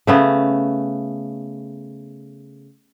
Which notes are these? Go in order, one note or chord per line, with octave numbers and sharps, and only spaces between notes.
C#3 A3 B3